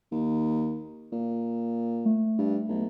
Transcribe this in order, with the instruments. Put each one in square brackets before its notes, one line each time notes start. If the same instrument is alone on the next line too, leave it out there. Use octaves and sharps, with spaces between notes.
[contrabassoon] D#2
A#2
[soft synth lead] A3
[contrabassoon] G2
B1